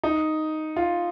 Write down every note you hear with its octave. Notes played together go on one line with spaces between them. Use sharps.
D#4
F4